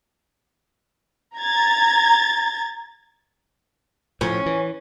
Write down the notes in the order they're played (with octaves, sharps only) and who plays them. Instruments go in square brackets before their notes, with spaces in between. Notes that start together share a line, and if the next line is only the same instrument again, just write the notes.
[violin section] A#5 G#6 A6
[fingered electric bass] A2 F3 [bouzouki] C#4
[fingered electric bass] E3